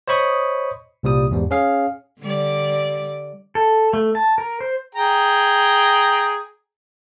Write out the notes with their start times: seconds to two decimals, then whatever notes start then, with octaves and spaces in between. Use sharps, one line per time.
0.08 C5 C#5 D#5 B5 C#6 D#6
1.03 C2 A#2 G3 D#6
1.31 E2 G#2 G3
1.51 C#4 G#4 F5
2.20 D3 G3 D5
3.55 A4
3.93 A3
4.15 A5
4.38 A#4
4.60 C5
4.95 G#4 G5 A#5